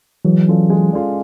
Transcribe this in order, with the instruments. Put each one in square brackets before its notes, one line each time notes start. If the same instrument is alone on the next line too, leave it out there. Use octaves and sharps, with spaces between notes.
[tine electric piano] E3 F#3 [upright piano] G#3
[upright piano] C#4 F4 A4 D5
G#3
C#4 F4 A4 D5